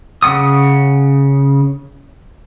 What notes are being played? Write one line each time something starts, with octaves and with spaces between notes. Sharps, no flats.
C#3 C4 F#5 D#6